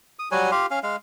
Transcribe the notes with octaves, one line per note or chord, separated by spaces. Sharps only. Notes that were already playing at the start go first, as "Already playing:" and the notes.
D#6
F#3 G3 F#4 G#5
F4 G4 F5
C#4 F5
G#3 F5